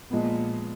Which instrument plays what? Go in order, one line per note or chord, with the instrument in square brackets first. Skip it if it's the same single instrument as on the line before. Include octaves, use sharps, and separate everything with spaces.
[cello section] A#2 [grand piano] F3 G#3 B3